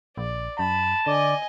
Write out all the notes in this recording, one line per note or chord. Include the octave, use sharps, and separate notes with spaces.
A#1 D5
F#2 A5 B5
D3 D5 D#5 G#5